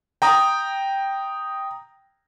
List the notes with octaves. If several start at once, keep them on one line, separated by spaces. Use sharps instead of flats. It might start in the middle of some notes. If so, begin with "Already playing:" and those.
G5 A#5 D#6